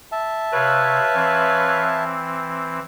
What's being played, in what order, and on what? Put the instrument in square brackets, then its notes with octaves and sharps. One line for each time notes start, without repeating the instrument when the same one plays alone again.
[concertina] E5 A5
[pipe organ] C3 [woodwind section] B4 C#5 F5
[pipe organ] E3 C4